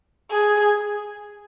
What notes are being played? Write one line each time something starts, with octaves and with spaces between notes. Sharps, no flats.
G#4